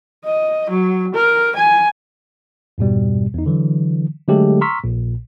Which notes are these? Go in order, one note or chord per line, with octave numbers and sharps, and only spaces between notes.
D#5
F#3
A#4
G#5
F2 G#2 B2 G3
E2 D#4
D3 E3 F#3
D3 F#3 G#3 A3 G4 A4
A#5 C6 C#6 E6 F6 B6
A#1 A#2